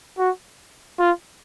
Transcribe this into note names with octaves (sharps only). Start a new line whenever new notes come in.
F#4
F4